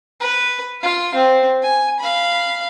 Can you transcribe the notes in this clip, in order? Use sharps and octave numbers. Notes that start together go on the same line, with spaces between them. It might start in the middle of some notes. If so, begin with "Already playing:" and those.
B4
F4 F5
C4
G#5
F5 B5